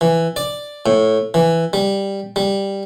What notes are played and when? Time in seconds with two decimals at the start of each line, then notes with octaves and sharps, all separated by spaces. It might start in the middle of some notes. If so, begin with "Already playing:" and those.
0.01 E3
0.36 D5
0.86 A2
1.34 E3
1.73 G3
2.36 G3